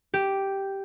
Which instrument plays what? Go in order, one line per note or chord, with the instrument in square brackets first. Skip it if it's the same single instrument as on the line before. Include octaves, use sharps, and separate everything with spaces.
[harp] G4